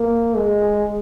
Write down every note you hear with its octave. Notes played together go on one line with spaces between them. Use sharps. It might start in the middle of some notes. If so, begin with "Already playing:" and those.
Already playing: A#3
G#3